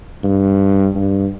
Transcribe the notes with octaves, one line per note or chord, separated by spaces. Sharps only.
G2
G2